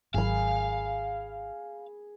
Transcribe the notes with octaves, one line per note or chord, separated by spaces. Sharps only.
G#1 F#3 G#4 F5 B5